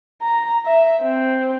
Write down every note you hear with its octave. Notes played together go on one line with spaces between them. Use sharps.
A#5
E5
C4